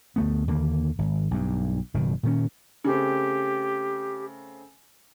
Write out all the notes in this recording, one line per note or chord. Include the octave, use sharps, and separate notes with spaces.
D2 A3 B3
D#2 D3 E3 A#3
G#1
B1 G2
F#1 B2 D#3
A#2 D#3 C#4
C#3 A3 C4 G4